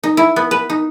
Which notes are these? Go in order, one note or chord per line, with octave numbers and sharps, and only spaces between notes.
D#4
E4
B3
B4
D#4